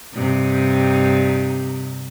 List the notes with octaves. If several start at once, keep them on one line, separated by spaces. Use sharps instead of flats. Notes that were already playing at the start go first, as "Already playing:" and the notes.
G2 C3 D#4